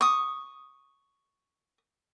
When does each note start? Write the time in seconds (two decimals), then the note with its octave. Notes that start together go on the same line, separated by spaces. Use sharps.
0.01 C#6 D#6